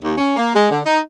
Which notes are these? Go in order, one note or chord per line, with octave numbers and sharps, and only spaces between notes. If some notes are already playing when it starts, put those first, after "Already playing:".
D#2
C#4
A#3
G#3
D3
D#4